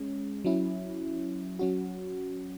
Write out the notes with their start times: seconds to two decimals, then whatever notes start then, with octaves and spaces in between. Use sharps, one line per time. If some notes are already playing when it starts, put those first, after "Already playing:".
Already playing: G#3 C#4
0.44 F#3 C#4 E4
1.59 F#3 C#4 F#4